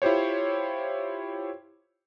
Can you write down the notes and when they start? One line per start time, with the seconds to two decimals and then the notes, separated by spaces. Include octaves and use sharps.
0.02 E4 F4 G4 C5 C#5